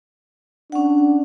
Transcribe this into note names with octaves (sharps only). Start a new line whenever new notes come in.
C#4 D4 F#5